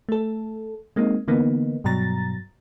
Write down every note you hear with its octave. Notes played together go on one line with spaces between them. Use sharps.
A3 A4
G#3 A#3 C4 D#4
D3 E3 A#3 B3 D#4
G2 B2 F#3 A#5 A6